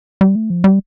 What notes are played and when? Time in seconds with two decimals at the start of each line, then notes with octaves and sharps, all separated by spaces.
0.21 G3
0.35 A3
0.50 F3
0.64 G3